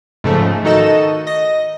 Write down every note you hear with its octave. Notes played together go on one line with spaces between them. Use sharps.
G#2 C#3 F3 A3
D#3 D#4 F#4 A4 D#5 E7
D#5 A#6